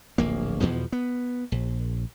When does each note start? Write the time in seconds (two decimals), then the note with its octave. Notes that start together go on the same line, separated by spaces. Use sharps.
0.18 D1 A#1 A#3
0.61 E2 B2 E3 F3
0.92 B3
1.52 A#1